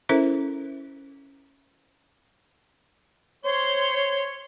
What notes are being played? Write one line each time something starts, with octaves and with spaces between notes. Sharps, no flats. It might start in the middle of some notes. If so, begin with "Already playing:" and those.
C#4 E4 A4 A#4 C5 E5
C5 C#5 C6